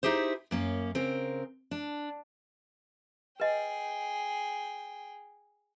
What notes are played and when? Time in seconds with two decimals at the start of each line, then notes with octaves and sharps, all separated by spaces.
0.03 D#4 E4 G4 G#4 C5
0.51 F#2 A#3 C#4
0.95 C#3 C4 A#4
1.71 D4
3.40 G#4 B4 D#5 G5